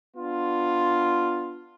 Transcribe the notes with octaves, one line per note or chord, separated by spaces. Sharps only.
B3 D4 F4